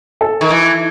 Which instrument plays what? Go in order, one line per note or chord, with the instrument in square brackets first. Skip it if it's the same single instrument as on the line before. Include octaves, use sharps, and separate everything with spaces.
[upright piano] A4
[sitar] D#3
E3